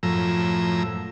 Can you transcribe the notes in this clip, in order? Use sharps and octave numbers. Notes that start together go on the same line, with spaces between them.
F#2 A2 F3 A#5 E6